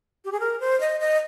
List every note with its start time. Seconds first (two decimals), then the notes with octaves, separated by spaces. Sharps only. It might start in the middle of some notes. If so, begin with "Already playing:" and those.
0.25 G4
0.32 G#4
0.40 A#4
0.60 C5
0.80 D#5
1.00 D#5